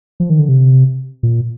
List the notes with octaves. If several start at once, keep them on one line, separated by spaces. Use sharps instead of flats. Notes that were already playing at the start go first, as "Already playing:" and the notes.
F3
D#3
D3
C3
A#2